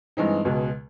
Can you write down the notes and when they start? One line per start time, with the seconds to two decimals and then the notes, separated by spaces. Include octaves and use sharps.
0.17 G2 E3 G#3 C4 D#4
0.45 C#2 B2 G#3